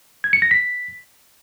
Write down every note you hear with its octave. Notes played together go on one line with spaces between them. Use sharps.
G#6
C#7
A#6
B6